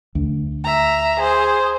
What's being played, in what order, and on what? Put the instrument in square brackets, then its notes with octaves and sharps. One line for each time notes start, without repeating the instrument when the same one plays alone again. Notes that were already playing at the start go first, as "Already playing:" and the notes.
[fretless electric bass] D2
[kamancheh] E5 A#5
G#4 C5